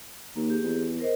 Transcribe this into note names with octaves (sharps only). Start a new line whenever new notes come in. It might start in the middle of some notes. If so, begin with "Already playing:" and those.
D#2 A#3
G4 G#4
E2
A#4 C5 D#5